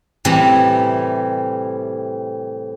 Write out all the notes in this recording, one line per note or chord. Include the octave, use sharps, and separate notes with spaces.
A2 C3 E3 G3